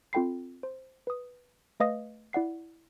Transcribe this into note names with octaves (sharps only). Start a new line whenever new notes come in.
C4 F4 A4 G5 B5 C7
C5
B4 D#6
A3 B4 D#5 F5 D#6 A#6
E4 D5 F#5 C7